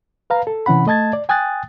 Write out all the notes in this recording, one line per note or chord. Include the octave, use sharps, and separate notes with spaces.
B4 F5 A#5
A4
C3 E3 C#4 F#5 B5
A3 D#5 A5 G#6 A6
D5
G5 G#5 D#6 F#6 A6